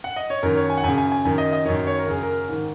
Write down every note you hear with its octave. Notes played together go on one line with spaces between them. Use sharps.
F#5
D#5
C#5
F#2 D#3 A#4
C#5
G#5
F#5
F#2 C#3 G#5
G#5
G#5
F#2 D#3 G#5
D#5
D#5
F#2 D#3 C#5
C#5
A#4
F#2 C#3 G#4
A#4
G#2 D#3